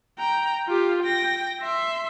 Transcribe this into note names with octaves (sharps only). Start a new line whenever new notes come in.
G5 A#5
F4 G4
G5 A#6
E5 C6